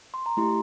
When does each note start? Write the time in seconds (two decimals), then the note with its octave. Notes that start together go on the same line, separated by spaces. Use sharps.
0.14 C6
0.26 A#5
0.37 A3 E4 G4 C6